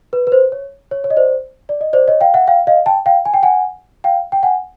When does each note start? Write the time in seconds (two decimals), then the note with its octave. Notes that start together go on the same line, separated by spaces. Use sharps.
0.13 B4
0.27 B4
0.32 C5
0.52 C#5
0.91 C#5
1.04 C#5
1.10 D#5
1.17 C5 D5
1.69 D5
1.81 D#5
1.93 C5 D5
2.08 C#5 D#5
2.21 F5 G5
2.34 E5 F#5
2.47 F5 G5
2.67 D#5 F5
2.86 G5 A5
3.06 F5 G5
3.25 G#5
3.34 G5
3.43 F#5 G#5
4.04 F5 G5
4.32 G5
4.43 F#5 G#5